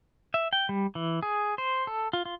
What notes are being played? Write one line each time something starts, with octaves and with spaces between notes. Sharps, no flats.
E5
G5
G3
E3
G#4
C5
A4
F4
F4